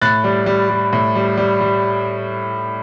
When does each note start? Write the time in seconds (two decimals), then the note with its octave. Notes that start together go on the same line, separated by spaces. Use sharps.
0.02 A2 F#6 A6
0.24 G3
0.46 G3
0.69 G3
0.93 A2
1.15 G3
1.37 G3
1.61 G3